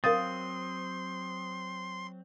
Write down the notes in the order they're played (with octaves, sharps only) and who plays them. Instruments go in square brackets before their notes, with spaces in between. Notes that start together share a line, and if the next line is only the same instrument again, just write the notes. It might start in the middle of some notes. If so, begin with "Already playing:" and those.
[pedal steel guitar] F#3 C4 [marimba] A#4 F5 A6 [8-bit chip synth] C6 [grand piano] D#6